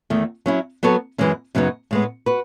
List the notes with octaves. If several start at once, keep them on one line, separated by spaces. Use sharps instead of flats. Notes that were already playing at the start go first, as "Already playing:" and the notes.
E2 D#3 A3
F#3 C#4 E4
F#3 B3 F#4 A4 C#5
F#2 E3 G#3 C#4
F#2 C#3 F#3 B3 D#4
A2 G#3 B3
F#4 B4